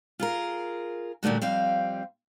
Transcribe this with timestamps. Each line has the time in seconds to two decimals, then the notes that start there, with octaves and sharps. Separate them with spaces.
0.19 F4 G#4 A#4
1.23 A#2 D3 G3 A3 F#4
1.42 F2 G3 C4 F5